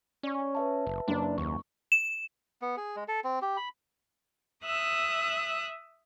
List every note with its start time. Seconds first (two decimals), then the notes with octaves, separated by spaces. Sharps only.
0.23 C#4 D5 C#6
0.55 B4 E5 A5
0.87 F#1
1.08 F#1 D4
1.38 D#2 C#6
1.92 E7
2.62 B3
2.77 G#4
2.96 G#3
3.08 A4
3.24 C4
3.42 G4
3.57 B5
4.64 E5 D#6 E6 F#6